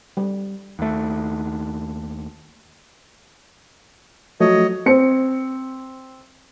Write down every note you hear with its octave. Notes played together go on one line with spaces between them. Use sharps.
G3
D#2 A3
F3 F#3 A3 C#5 D#5
C4 C#7